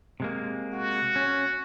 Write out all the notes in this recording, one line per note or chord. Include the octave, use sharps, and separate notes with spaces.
C3 G#3 A#3
F#4
C#4